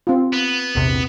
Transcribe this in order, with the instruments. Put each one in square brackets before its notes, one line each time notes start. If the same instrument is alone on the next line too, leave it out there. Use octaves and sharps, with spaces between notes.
[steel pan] C4 F4
[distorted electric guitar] B3
[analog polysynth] A#1 E2 C3